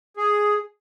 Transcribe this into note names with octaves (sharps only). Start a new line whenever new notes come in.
G#4